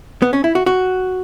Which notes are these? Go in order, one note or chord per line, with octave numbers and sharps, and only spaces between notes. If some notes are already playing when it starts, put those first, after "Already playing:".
B3
C#4
E4
F#4
F#4